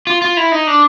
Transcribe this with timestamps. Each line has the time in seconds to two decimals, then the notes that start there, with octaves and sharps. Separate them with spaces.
0.07 F4
0.22 F4
0.37 E4
0.52 D#4
0.67 D4